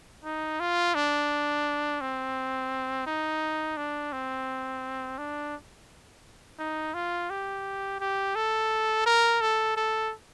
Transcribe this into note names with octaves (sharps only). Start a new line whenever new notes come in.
D#4
F4
D4
C4
D#4
D4
C4
D4
D#4
F4
G4
G4
A4
A#4
A4
A4